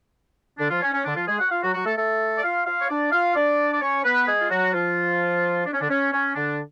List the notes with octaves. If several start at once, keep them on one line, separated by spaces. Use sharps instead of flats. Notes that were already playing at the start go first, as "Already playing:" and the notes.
D3 D4
F3 F4
C#4
C#4
D3 D4
F3 F4
G#3 G#4
F#4 F#5
F4 F5
F#3 F#4
F#3 F#4
A3 A4
A3 A4
D5
F4 F5
F4 F5
C#5
D4 D5
F4 F5
D4 D5
D5
C#4 C#5
B3 B4
G#3 G#4
F4
F#3 F#4
F3 F4
D4
C#4
D3 D4
C#4
C#4
D3 D4